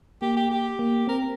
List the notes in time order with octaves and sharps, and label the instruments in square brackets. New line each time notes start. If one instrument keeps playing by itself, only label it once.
[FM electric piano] A#3 [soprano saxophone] G4
[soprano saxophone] G4
G4
[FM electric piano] A#3
[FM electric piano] C4 [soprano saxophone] A#4